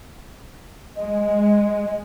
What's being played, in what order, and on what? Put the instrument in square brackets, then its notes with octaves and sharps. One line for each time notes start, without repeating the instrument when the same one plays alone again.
[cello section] G#3 [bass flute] D#5